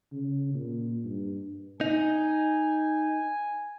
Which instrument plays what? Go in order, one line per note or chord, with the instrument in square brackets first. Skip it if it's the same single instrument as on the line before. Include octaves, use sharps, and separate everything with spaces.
[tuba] C#3
A#2
G2
[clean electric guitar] D#4 [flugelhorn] G#5